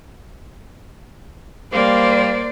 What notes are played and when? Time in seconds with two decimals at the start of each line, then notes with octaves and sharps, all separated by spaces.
1.73 G3 A#3 C5 D5 F5